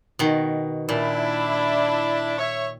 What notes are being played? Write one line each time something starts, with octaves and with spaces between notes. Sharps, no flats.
B2 D#3
A#2 D4 E4
C#5 E5